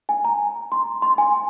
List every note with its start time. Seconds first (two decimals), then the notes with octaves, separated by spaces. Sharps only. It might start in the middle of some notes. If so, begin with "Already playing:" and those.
0.09 G#5
0.24 A#5
0.72 C6
1.02 C6
1.18 G#5